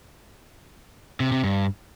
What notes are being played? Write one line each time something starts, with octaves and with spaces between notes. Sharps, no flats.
C3
C3
G2